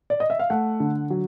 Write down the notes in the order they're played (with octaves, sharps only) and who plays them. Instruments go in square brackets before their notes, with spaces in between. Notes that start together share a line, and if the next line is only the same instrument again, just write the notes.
[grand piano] D5
D#5
E5
F5
A3 F#5
D3
F#3